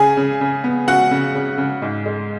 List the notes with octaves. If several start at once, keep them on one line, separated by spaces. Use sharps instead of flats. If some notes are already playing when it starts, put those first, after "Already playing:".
Already playing: C#3 G#4 G#5
C#3
C#3
B3
C#3 F#4 F#5
C#3
C#3
C#3
G#2
G#3